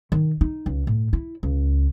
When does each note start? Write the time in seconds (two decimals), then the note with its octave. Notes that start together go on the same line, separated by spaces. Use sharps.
0.12 D#3
0.41 D#4
0.66 C#2
0.87 A2
1.13 E4
1.43 C#2